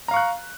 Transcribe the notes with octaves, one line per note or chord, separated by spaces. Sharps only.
F5 A#5 C#6 F#6